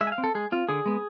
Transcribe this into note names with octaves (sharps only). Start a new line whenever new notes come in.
G#3 E5
G#5
F5
C4
A4
G#3 G#4
C4 F4
D3 G#4
G#3 B3